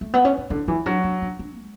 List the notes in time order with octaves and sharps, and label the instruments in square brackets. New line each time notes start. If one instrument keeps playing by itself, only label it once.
[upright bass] A3
B3
C#4
D4
[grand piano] D3 [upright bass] E4
[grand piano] E3 [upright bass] E4
[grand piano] F#3 [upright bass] D4
[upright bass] D4
D4
D4
G#3